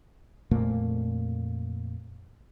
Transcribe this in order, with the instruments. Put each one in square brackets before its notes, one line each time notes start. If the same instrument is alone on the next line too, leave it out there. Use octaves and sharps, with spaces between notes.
[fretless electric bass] F2 A#2 A3 A#3